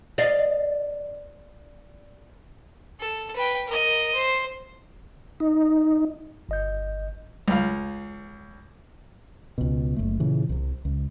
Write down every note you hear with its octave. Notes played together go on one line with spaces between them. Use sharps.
D5 D#5 F5
A4
B4 G5
A#4 D#5
C5
D#4
G1 D#5 G6
C#2 F5
C#2 B2
F#1 A3
A#2 C#3 E3
C2 C3
C#2